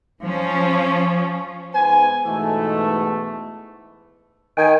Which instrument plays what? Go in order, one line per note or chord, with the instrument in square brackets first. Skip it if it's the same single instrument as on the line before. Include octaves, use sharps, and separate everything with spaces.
[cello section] F3 C#4
[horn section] G#2 B3 C5 G#5
G#2 B2 E3 A3
[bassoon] D#3 [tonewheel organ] G5 G#5